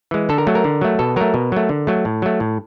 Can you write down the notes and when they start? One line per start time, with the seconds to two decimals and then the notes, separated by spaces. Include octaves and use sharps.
0.11 E3 G#3
0.29 D3 A4
0.38 A#4
0.47 F#3 A3
0.55 A#4
0.64 D3
0.81 F#3 A3
0.99 B2 A4
1.16 F#3 A3 A#4
1.34 B2
1.52 F#3 A3
1.69 D3
1.87 F#3 A3
2.05 A2
2.22 F#3 A3
2.40 A2